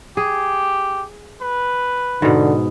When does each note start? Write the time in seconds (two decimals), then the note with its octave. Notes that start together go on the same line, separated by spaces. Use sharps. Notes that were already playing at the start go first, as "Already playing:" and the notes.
0.17 G4 G#4
1.42 B4
2.22 G#2 B2 D3